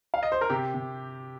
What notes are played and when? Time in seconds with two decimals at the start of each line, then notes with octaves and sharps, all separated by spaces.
0.14 F5
0.23 D#5
0.32 C5
0.41 A#4
0.50 C3 G4
0.74 C3